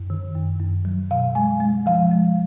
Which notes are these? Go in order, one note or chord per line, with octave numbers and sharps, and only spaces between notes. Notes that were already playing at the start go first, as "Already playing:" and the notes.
Already playing: F#2
D#3
F#2
F#2
F#3
B2 F5
G#3 G#5
G#3
F3 F5
G#3